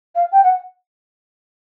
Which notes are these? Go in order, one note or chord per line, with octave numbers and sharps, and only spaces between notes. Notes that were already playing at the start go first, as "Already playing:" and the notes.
F5
G5
F#5